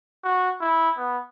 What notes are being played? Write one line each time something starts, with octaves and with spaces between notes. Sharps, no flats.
F#4
E4
B3